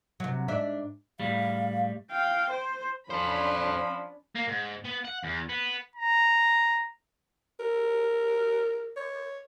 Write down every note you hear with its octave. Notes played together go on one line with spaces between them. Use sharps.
C3 F#3
G#2 D4 E5
A2 G3 F5
F5 G5
C5
F3 C#4 D4 A4 C5 B5
A#3
G#2
B3
F#5
E2
B3
A#5
A#4
C#5